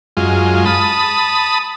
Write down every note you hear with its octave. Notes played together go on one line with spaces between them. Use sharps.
F#2 G#3 F4
A5 B5 D#6